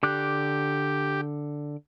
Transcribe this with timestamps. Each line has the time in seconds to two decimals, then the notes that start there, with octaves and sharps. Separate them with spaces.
0.03 D3 G4 D6 F#6